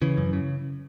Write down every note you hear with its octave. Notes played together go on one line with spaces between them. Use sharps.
C#3 E3
F#2
C#3